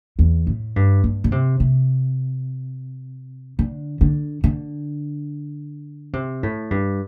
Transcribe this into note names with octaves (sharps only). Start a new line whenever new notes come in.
E2
A2
G2
G2
D3
C3
C3
D3
D3
D3
C3
A2
G2